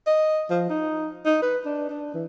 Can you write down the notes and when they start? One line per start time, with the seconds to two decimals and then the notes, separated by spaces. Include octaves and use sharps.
0.07 D#5
0.50 F3
0.70 D#4
1.25 D#4
1.42 B4
1.65 D4
1.89 D4
2.14 E3